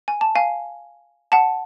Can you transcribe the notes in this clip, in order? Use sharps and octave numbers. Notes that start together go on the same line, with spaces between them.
G#5
A5
F5 G#5
F#5 A5